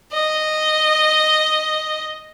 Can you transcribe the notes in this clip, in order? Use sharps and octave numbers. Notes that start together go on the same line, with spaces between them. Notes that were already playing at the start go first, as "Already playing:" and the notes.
D#5